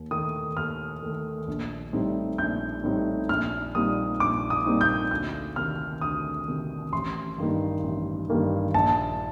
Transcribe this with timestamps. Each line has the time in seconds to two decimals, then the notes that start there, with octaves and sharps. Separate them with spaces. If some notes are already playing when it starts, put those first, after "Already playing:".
Already playing: D#2
0.11 D#3 A3 D#6
0.57 D#2 F6
1.03 D#3 A3
1.48 A#1
1.93 A2 G3 C4 D#4
2.38 A#1 G6
2.84 A2 G3 C4 D#4
3.29 A#1 F6
3.75 A#2 G3 C4 D#4 D#6
4.20 A#1 D6
4.50 D#6
4.66 A#2 G3 C4 D#4
4.81 G6
5.11 D2 G6
5.56 C3 D#3 F6
6.01 D2 D#6
6.47 C3 D#3
6.93 A1 C6
7.38 G2 D#3 A#3 D#4
7.83 A1
8.29 G2 D#3 A#3 D#4
8.74 A#1 A5